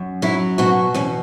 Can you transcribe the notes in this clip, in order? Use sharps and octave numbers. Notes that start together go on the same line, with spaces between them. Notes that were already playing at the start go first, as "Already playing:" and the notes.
Already playing: F#2
F#3 E4
B2 F#4
E2 C#4